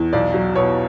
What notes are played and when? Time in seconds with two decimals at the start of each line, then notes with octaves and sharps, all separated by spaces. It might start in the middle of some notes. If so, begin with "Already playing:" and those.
Already playing: E2
0.13 B1 D5
0.34 F#3
0.56 B2 C#5